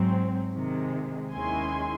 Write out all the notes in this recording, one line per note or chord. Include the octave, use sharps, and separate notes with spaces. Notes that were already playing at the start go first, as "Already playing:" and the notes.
Already playing: G#2 F#3 C4
C3 D#3 G#3
D#2 D#3 G#3 C#4 E4 G#5 C6